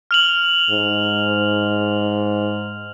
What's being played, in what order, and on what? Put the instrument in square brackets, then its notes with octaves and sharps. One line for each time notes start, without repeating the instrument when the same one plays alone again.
[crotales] F6 F7 F#7
[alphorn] G#2